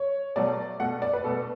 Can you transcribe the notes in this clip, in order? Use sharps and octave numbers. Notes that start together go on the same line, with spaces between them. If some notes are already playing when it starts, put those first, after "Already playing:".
Already playing: C#5
B2 F#3 A3 D5
B2 A3 F#5
D5
B4
B2 A3 A4